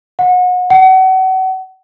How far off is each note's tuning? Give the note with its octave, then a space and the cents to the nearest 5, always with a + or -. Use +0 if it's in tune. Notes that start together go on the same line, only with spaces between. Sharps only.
F#5 -30
F#5 +35